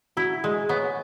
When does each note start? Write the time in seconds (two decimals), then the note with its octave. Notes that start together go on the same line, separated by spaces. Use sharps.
0.17 E4 F#4
0.44 G#3 G#4
0.69 B3 C#5